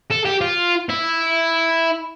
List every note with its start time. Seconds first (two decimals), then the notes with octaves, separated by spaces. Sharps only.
0.10 A4
0.25 G4
0.41 F4
0.89 E4